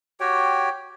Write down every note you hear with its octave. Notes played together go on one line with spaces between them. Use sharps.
F#4 G4 C#5 G5